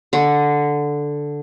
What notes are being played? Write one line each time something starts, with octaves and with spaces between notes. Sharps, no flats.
D3